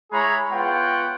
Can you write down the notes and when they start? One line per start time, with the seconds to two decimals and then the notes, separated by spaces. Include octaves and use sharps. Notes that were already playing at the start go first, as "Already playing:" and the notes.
0.12 G#3 E4 G#4 C#5 A#5 B5
0.52 B3 F4 C#5 F#5 G5